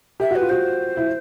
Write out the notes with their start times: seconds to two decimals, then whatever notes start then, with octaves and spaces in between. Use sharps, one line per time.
0.20 G4 E5
0.31 F#4 B4
0.41 F4
0.49 F#4 C5
0.97 E4